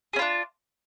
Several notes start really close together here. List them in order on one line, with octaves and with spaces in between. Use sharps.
G#4 C#4 F4 D4